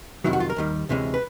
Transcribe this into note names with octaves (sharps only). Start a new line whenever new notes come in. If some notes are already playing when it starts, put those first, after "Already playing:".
F2 C3 D#3 F#3 E4
F#4
F4
A#4
D#2 D#3 G3
D2 C3 E3 G#3 C#4
B4